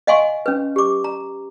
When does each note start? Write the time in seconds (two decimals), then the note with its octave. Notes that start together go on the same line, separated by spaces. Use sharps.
0.07 D#5 F5 F#5 G#5 C6 C#6
0.46 C#4 B4
0.76 G4 D6
1.04 A#5